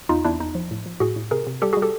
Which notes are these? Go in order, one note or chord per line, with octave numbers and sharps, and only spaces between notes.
E2 D#4 F4
E2 D4 E4
E2 D#4
F3
A2
F3
A2 F#4 G#4
A2
C3 G#4 A#4
C3
G3 G4 A4
G3 F#4 G#4
G4 A4